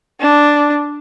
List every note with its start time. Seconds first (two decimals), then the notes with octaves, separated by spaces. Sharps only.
0.21 D4